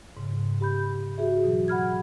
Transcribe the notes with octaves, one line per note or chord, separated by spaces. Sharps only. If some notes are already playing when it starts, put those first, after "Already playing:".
G#2 C#3
G4 B5 G6
F#4 G#4 E5
B2 E3 F#3
F#5 B5 F6 G#6